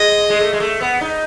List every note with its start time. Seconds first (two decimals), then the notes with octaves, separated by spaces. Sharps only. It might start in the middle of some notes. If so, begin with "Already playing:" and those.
Already playing: G#3 D#5
0.30 G#3
0.40 A3
0.53 G#3
0.60 A3
0.81 B3
1.01 D#4